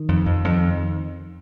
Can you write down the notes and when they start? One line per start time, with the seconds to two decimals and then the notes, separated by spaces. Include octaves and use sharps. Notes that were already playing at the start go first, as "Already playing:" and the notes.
Already playing: D#3
0.09 F2
0.26 F2
0.44 F2